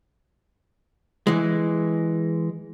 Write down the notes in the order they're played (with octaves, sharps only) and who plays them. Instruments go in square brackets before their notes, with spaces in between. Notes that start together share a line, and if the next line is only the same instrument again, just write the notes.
[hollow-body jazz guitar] E3 G#3